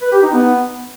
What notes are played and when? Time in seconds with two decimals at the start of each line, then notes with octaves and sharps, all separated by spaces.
0.02 B4
0.12 G4
0.23 D#4
0.33 B3